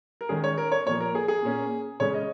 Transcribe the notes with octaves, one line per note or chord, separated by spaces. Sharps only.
A#4
D#3 G#3 C#4 G#4
C#5
A#4
C#5
A#2 F3 A#3 C#5
A#4
G#4
G#4
A#2 A#3 C#4
C#3 G#3 C#4 C#5
D#5